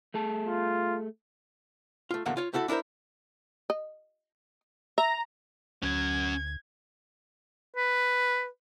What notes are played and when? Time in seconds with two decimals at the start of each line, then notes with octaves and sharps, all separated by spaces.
0.14 A3 G#4 A5
0.47 F4
2.11 A3 F4
2.26 E2 A#2 D3 F#3 A#3 F#5
2.37 F4 C#5
2.53 A3 E4 F#4 A4
2.68 D4 E4 A4 A#4 C5
3.70 D#5
4.98 E5 A#5
5.83 D2 F#3 C#4 G#6
7.76 B4